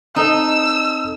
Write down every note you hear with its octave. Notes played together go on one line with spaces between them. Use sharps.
C4 D#4 A4 D#5 E6